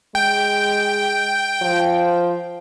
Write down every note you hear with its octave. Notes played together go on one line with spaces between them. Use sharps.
G#3 G5
F3